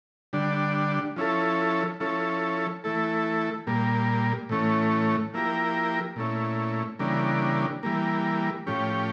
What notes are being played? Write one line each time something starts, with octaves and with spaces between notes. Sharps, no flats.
D3 G3 D4
F3 C#4 E4 A4
F3 C#4 E4 A4
E3 A3 E4 A4
A#2 G3 A#3
A2 E3 A3 C#4
F3 A#3 E4 G4 A#4
A#2 A3 C#4 E4
C#3 E3 G3 A#3 D4
E3 G3 A#3
A2 F3 C#4 G4